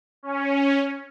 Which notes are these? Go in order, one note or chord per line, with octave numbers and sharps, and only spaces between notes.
C#4